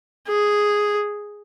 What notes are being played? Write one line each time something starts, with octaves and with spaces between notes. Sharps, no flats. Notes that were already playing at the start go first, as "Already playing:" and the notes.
G#4